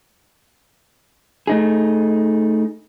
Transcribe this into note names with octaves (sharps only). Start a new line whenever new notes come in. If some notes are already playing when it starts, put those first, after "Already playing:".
A3 D#4 G#4